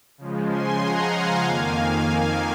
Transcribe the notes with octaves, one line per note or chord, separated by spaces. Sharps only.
C#3 F3 G#3
G#5 C6
F#5 A#5
F5 G#5
F2 D#3 A#3 F5 G#5
F5